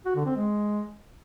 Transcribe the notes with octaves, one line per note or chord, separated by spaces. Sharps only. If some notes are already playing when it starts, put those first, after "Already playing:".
F#4
D3
C4
G#3